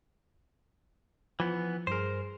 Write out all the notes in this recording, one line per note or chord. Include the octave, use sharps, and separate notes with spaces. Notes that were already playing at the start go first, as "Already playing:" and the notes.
E3 F3 B3
G2 G#4 A#4 C5